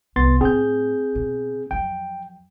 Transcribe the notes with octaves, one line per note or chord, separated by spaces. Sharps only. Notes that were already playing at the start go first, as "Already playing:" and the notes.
C2 F2 B3 C6 A6
A2 C4 G#4 G6
B2
F2 F#3 G5